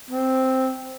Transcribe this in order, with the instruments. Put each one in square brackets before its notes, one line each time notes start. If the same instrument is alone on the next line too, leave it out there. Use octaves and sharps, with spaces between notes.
[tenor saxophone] C4